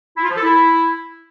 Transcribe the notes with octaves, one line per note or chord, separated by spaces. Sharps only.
E4
F4
F3
A4
E4